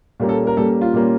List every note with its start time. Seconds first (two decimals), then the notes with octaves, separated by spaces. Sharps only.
0.20 A#2 G3 A#3 C#4
0.29 A4
0.47 A#4
0.57 A#2 G3 A#3 C#4 A4
0.81 F4
0.93 A#2 G3 A#3 C#4